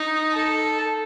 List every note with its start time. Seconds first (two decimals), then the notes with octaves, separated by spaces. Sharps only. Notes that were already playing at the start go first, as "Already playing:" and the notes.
Already playing: D#4
0.34 A4